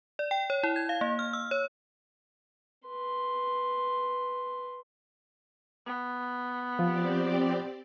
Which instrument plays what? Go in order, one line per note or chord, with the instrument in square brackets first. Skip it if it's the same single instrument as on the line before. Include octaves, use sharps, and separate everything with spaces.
[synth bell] D5
G5
C#5
E4
G#6
F5
A#3
F6
E6
C#5
[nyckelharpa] B4 C6
[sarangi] B3
[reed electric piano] F3 F4 [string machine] C4 G4 D5